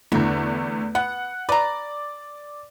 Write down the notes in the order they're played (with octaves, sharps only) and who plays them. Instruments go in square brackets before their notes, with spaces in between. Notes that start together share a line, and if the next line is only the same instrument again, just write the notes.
[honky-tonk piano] E2 D3 A3 [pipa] E3 F#4
[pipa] B3 [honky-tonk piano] F#5
[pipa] B4 A#5 [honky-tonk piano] D5